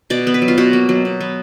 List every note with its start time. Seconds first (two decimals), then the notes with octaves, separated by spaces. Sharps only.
0.10 B2 D5
0.27 B3
0.34 B4
0.42 F#3
0.48 F4
0.58 B2 F#4
0.73 A#3
0.89 F#3
1.05 B2
1.21 B3